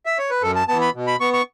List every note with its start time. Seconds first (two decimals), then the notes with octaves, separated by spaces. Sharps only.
0.06 E5
0.18 C#5
0.30 B4
0.42 F#2 A4
0.56 A5
0.68 E3 B3 A5
0.81 B5
0.95 B2
1.07 B5
1.20 B3 C#6
1.33 C#6